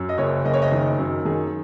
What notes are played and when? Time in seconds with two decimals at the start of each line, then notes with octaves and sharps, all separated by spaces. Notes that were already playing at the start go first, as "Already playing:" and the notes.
Already playing: F#2
0.09 D#5
0.18 F#1 C#5
0.44 F#1 D#5
0.54 C#5
0.62 D#5
0.72 D#3
0.99 F#2
1.25 D#3 G#4